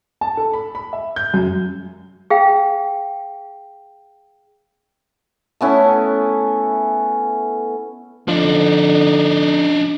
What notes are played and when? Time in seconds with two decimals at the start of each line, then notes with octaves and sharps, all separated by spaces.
0.21 A5
0.37 A4
0.53 B5
0.75 B5
0.93 E5
1.16 G6
1.34 F#2
2.30 G#4 F5 G5
5.61 A3 B3 C#4 E4
8.28 D3 F3 D4 D#4